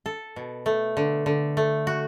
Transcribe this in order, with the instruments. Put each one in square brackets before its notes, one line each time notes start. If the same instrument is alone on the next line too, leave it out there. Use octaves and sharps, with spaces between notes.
[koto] A4
B2
A3
D3
D3
A3
F#4